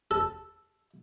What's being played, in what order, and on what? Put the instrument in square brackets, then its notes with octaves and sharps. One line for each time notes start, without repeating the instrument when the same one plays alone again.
[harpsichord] A4